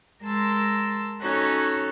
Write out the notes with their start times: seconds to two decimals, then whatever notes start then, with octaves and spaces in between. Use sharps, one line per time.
0.23 G#3 A#4 A5 C6 E6
1.22 C#4 D#4 F#4 A4 C#5